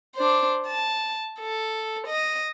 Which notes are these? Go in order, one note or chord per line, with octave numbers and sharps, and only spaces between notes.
D4 C5
A5
A4
D#5